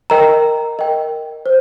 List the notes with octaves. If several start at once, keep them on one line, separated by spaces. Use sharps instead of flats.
A#4 D#5 G5 A#5
A#4 D#5 G5
C5